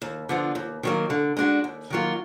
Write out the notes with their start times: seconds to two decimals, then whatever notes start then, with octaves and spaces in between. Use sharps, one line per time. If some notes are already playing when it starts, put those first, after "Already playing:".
0.02 D#2
0.29 D3 F3 B3
0.55 D#2
0.83 D#3 F#3 A#3
1.10 D3
1.37 G#3 D4 F#4
1.64 D#2
1.90 D#3 F#3 A#3 F4